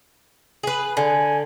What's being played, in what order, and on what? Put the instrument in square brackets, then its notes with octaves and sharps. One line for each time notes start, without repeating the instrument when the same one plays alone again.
[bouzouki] G#4 B4
[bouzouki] D3 [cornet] G#5